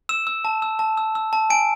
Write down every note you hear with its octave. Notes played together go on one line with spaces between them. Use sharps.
E6 E7
E6
A5
E6
A5
E6
E6
A5
G#5 D7